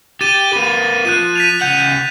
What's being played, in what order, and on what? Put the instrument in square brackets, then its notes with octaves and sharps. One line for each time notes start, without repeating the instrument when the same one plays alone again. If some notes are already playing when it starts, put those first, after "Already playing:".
[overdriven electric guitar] G4 [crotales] A6 D#7 E7
[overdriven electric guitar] A#3 B4
[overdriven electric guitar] F3 [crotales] F#6 D#7 E7
[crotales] B6 D#7 F7
[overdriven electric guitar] C#2 F#5 [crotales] G6 F7